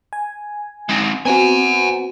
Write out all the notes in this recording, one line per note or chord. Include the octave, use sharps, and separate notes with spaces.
G#5
G#3 C4
B3 C4 F#4 F#5 G#5